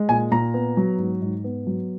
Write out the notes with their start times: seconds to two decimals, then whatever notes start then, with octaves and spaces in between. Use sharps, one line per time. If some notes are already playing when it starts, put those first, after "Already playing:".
Already playing: G#3
0.09 A#2 G#5
0.31 A#2 A#5
0.54 B3
0.77 F#3
0.98 G#2
1.22 G#2
1.44 B3
1.67 F#3